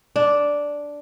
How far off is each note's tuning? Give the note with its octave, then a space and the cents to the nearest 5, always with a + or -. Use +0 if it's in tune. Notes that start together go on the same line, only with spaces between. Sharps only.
D4 -5